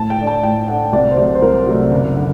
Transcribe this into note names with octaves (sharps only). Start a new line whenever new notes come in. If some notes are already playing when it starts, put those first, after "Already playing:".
Already playing: A2 A5
G5
A3 D4
A5
A2 G5
A3 D4 F#5
C2 D5
C5
C3 F#3 A3 D5
C5
C2 A#4
C3 F#3 A3
F#1
D3